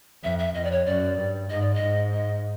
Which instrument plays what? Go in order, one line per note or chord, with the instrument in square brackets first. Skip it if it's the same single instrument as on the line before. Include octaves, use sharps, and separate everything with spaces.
[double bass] F2 [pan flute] E5
[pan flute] E5
[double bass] F2 [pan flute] D#5
[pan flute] D5
C#5
[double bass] F#2 [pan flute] D5
[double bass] G2
[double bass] G#2 [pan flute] D#5
[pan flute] D5
D#5
[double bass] G#2
[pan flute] D#5